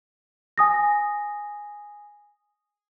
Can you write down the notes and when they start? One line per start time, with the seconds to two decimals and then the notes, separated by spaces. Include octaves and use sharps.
0.58 G#5 D#6 A#6